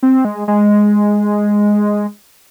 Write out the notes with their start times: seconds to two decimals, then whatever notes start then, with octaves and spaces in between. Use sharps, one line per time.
0.03 C4
0.25 G#3
0.48 G#3